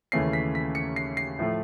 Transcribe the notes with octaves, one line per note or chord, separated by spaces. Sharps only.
D#2 C#3 E3 A3 C#4 C7
B6
B6
C#7
C7
C7
A2 F3 A3